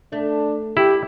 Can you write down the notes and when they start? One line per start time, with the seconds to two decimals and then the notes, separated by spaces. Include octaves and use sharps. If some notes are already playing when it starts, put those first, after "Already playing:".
0.12 A3 D4
0.77 E4 G4